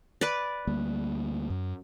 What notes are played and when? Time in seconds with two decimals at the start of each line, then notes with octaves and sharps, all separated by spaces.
0.21 B4 D5
0.67 D2 G3 A#3
1.50 F#2